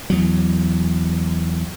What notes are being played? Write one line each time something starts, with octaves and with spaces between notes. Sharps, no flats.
E2 F#3